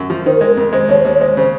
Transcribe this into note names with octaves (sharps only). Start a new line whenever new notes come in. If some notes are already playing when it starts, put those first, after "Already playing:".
Already playing: F#2
F3
D#3 C5
A#4
G#3
A#4
F2 A#4
G#3 C5
D#2 C#5
C5
D#2
C#5
G#3 C5
C#3 C5